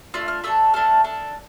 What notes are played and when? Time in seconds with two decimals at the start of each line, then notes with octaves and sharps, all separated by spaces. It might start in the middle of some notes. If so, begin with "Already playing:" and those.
0.14 A3 D4 F4 E6
0.28 F6
0.44 A3 D4 A4 E6
0.74 A3 D4 A4 F6
1.04 D4 A4